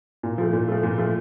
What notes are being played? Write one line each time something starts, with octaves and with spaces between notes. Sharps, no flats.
A#2
F3 A3
A#2
F3 A3
A#2
F3 A3